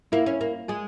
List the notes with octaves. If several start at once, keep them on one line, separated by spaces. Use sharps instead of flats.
A#3 E4
C#4
A#3
G#3 G#4